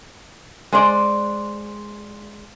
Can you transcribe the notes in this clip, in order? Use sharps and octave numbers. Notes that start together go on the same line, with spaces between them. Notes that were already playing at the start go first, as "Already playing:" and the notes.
G#3 C5 D5